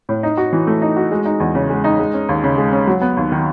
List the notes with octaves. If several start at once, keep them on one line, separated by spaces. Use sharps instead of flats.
A2
D#4
F#4
E3
A3
D#4
F#4
G#3
D#4
E2
C#3
G#3
D#4
G#3
C#4
D#2
C#3
G#3
C#4
F#3
B3
D#2
D#3